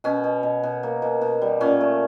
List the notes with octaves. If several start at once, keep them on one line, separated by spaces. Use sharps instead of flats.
B2 C#4
B2
B2
B2
A#3
B2
B2
G3
A#2 C#4
A3